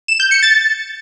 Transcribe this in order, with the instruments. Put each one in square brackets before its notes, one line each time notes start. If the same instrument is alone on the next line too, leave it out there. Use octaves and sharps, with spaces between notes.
[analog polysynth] E7
G6
C#7
A6